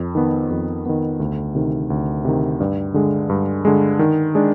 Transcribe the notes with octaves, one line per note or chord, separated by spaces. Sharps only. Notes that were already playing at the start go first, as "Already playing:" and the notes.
Already playing: F2
D#3 B3
F2
D#3 B3
D2
C3 D#3
D2
C3 D#3
G2
D3 G#3
G2
D3 G#3
D#3
G#3 D4